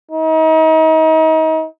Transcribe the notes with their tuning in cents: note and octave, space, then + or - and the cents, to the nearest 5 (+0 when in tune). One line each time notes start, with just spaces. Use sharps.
D#4 +35